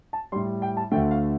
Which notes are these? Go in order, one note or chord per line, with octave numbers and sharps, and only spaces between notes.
A5
A2 G3 C6
G5
A5
D2 D3 A3 G5
F5